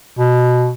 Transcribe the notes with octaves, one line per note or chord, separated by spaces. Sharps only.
B2